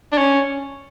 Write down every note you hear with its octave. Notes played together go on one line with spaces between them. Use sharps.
D4
C#4